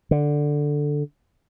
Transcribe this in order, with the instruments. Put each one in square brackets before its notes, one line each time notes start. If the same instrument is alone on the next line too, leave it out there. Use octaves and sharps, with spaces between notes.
[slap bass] D3